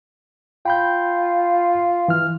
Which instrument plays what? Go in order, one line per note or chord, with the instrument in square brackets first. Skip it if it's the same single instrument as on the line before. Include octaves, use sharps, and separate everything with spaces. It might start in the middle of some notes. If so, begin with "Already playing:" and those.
[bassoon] F4 [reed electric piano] G5 B5 G6
[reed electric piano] E3 F6